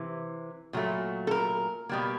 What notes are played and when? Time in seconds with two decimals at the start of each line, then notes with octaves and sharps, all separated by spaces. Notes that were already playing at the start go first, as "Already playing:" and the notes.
Already playing: C3 E3
0.73 A#2 F#3 A3
1.27 A4
1.31 A#4
1.89 B2 G3 A#3